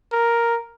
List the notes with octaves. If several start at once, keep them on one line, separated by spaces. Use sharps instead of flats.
A#4